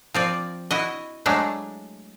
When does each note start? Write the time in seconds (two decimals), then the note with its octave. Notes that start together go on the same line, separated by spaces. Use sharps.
0.14 F3 C4 D5
0.71 E4 F#4 D#5
1.26 F#3 G#3 A3 D4